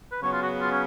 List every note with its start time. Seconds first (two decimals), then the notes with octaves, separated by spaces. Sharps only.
0.11 B4
0.22 C#3 F#3 B3 C#5
0.32 F4
0.42 F#4
0.61 F4
0.71 C#4